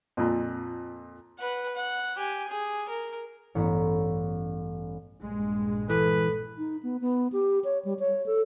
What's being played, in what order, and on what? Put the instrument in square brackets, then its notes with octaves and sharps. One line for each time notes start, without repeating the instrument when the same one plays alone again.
[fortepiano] F2 A#2
[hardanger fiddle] B4 F#5
F#5
G4 G#5
G#4
A#4
[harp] A1 G2 B3 C#4 A#5
[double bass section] A#1 G2 G#3
[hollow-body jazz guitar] E3 [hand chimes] A4 [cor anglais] B4
[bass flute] D#4
B3
B3
G4
C#5
G3
C#5
A4